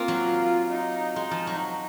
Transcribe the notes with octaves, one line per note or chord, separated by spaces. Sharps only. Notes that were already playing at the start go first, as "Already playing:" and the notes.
Already playing: A#3 C4 F4
F#3
D#4
G#3 D#4
F3
F#3